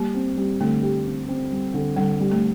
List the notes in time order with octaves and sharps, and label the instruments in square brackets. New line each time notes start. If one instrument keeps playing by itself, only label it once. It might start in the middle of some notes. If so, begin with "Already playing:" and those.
Already playing: [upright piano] G3 [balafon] A#3
[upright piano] C4
G3
[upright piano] D3 [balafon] A3
[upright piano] G4
C4
C4
G3
D3
[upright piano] D3 [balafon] G3
[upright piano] G3
[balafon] A3